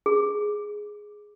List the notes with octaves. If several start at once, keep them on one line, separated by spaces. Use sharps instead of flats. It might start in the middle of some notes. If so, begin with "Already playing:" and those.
G#4